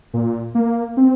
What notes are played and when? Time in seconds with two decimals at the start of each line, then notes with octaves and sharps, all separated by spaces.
0.13 A#2
0.55 A#3
0.97 C4